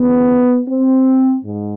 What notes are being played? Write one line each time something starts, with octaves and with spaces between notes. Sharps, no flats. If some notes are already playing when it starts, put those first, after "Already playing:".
Already playing: D2 C#3 E3 B3
C4
G#2